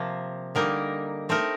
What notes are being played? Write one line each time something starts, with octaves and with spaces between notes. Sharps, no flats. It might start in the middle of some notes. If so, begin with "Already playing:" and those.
Already playing: C3 F3 A#3
D3 G3 A#3 D#4 A#4
A3 C4 D#4 A#4